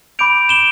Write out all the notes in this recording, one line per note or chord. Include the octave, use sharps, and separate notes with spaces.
B5 D6 G6 D7 F7
E7 G7